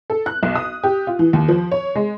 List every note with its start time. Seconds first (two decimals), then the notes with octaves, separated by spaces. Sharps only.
0.10 A4
0.26 F#6
0.43 B1
0.56 D#6
0.84 G4
1.07 F4
1.19 E3
1.33 D#2
1.48 F3
1.71 C#5
1.95 G#3